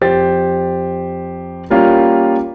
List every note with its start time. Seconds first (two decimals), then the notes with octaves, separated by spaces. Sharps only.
0.01 F2 G4 C5 A6
1.70 G3 A#3 C#4 F4 G4 F5